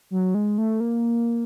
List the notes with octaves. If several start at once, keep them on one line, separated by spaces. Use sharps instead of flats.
F#3
G#3
A3
A#3